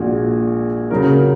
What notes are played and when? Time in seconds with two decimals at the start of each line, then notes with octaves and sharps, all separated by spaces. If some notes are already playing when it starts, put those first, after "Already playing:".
Already playing: A#1 A#2 G#3 F#4
0.91 C#3 F#3 C#4 A#4